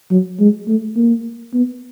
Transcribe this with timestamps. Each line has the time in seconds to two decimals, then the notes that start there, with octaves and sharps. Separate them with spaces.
0.11 F#3
0.40 G#3
0.68 A3
0.96 A#3
1.54 B3